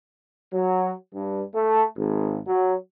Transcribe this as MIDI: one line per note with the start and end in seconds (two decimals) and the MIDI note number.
0.53 0.92 54
1.14 1.43 43
1.54 1.84 57
1.97 2.38 32
2.47 2.74 54